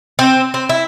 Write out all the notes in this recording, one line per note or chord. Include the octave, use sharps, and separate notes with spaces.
C4
C4
E4